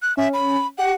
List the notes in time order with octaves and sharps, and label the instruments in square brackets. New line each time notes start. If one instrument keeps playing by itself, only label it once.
[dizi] F#6
[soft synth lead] C#4 [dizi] E5
[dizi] B5
[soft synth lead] G4 [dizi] F#5